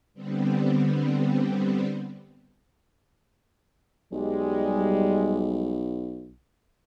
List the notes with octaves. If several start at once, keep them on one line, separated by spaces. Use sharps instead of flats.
D3 G3 B3 C4
B1 G3 G#3